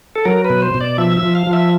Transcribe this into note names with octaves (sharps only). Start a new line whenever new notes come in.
A4
F#3 A#4
B4
B2
C5
B2
D5
F3 E5
E5
F3
F5
F3
E5